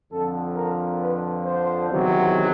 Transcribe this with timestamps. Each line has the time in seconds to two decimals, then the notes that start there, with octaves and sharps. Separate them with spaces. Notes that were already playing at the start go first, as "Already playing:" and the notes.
0.12 F2 D3 F3 A4
0.56 A#4
1.00 B4
1.45 C5
1.89 E2 C3 D#3 F#3